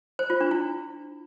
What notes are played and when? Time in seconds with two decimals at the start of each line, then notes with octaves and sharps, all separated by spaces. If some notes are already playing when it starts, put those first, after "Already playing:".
0.19 C5
0.30 F4
0.41 D4
0.51 E4